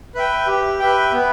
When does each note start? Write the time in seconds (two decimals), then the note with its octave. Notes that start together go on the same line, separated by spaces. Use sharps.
0.15 B4 E5 G5
0.47 G4
0.79 B4 E5 G5
1.12 B3